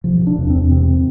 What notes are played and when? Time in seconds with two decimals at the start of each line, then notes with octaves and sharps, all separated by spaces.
0.04 C3 F3
0.21 C3
0.27 D4
0.38 E2
0.50 C4
0.55 E2
0.71 C3 C4
0.89 C3